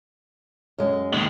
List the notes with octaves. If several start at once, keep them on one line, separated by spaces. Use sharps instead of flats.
F#2 G#3
D#2 G#3